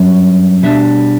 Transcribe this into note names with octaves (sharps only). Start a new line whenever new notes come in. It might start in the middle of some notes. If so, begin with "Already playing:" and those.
Already playing: G2 F#3 C#4
B2 G3 D4 E5